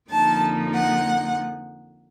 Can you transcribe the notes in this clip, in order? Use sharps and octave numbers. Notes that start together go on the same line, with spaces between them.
F2 D3 F3 A#3 D#4 A5
F#5